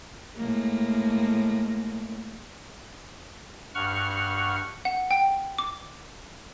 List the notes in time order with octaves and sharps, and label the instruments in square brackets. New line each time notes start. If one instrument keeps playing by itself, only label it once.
[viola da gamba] A2 G#3 A#3
[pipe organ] G2 F#5 C#6 F6
[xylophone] F#5
G5
D6